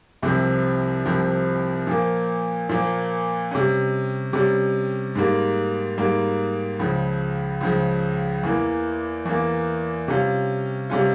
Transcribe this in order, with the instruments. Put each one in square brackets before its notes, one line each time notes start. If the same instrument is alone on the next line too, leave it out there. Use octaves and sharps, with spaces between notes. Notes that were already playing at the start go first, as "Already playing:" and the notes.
[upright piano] C2 C3 F3 C4
C2 C3 F3 C4
A#2 F3 A#3
A#2 F3 A#3
C3 G3 C#4
C3 G3 C#4
G#2 G3 A#3
G#2 G3 A#3
C#2 C#3 F3
C#2 C#3 F3
E2 E3 A#3
E2 E3 A#3
C3 G3 C#4 F4
C3 G3 C#4 F4